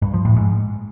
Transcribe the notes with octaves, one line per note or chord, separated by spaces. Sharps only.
G2
F3
A2
G#2